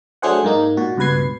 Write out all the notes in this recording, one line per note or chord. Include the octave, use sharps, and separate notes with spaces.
F#3 A3 D4 G#4 C5 F#5
G#2 A#3 D#4
A#2 F#4
C#2 G2 B2 B4 G#6 C7